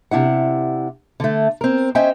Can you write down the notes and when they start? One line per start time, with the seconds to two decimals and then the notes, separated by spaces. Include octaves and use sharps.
0.11 C3 D4 E4 F#5
1.20 D3 A3
1.61 C4 A#4
1.95 C#4 C5 D#5 E5 G5 G#5